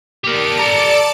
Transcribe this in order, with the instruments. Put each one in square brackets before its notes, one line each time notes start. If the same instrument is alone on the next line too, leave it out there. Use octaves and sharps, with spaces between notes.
[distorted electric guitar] G4 A#4 [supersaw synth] D5 A5 D7
[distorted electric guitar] A4 A#5